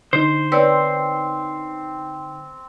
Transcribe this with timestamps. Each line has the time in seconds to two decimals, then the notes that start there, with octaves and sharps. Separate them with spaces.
0.13 D3 D#4 C5
0.52 C4 B4 C#5 D5